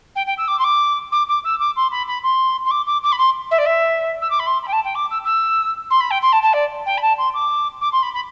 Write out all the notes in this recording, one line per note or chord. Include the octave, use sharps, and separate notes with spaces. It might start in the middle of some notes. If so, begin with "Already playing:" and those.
G5
G5
E6
D6
C6
D6
D6
D6
E6
D6
C6
B5
B5
C6
C6
D6
D6
D6
B5
C6
E5
D5
E5
E6
D6
B5
C6
B5
G5
A5
G5
D6
E6
E6
C6
B5
G5
C6
A5
A5
D5
G5
B5
A5
C6
D6
D6
C6
B5
B5